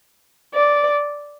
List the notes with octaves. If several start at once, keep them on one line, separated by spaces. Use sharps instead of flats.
D5